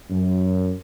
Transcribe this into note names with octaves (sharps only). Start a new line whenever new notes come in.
F#2